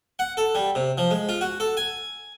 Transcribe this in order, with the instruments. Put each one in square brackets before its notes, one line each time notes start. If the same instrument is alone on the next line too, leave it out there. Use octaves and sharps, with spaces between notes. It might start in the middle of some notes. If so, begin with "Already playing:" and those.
[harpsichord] F#5
A4
G3
C3
F3
G#3
F4
F#4
A4
G#5